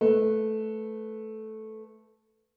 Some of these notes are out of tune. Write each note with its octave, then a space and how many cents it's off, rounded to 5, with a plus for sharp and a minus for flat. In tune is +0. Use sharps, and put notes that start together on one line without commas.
A3 -10 B4 +0